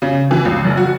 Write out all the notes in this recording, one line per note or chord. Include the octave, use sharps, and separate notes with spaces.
C#3
E3
C#2
F#1
F#4